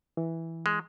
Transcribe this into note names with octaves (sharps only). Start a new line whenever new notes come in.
E3
G#3